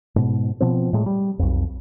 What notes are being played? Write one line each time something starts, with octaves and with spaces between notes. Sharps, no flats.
G#2 B2
B2 F3 C4
A2 G#3
G3
B1 F2